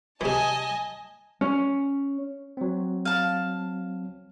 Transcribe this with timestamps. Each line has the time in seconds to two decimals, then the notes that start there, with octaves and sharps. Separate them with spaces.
0.21 C3 E3 D#5 G#5 A5
1.41 C#4
2.57 F#3 C4
3.05 F5 A5